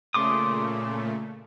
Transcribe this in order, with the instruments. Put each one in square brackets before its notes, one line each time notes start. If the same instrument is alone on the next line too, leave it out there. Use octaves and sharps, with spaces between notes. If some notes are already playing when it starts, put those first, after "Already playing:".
[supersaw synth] A#2 C#3 A3 [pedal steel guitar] C6 D6 D#6